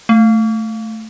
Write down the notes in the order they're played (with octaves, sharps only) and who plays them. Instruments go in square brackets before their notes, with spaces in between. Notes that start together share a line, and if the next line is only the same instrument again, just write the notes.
[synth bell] A3